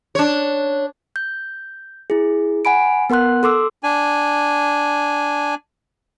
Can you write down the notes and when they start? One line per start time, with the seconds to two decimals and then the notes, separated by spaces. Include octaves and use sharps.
0.15 D4 C#5
1.16 G6
2.10 E4 G#4
2.65 F#5 G#5 B5 D7
3.10 B3 A#4 F#5 C6 F#6
3.43 A4 C6 D6 E6
3.83 D4 G#5